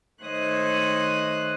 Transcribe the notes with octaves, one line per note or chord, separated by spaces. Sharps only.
D#3 A3 C5 C#5 D#5 F#6